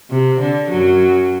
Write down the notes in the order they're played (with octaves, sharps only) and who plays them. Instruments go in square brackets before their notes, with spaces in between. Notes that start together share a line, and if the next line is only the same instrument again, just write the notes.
[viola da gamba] C3
D3
F#2 F#3